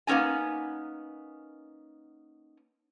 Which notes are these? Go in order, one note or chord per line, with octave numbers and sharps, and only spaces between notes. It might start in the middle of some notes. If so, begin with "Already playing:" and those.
A#3 B3 C#4 D#4 G#5